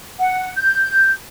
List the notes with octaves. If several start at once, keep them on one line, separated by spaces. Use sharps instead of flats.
F#5
G6